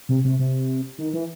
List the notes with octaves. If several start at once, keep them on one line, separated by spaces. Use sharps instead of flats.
C3
C3
C3
D#3
E3